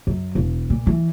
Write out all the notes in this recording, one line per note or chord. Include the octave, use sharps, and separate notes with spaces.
F#2
E1
A#2
E3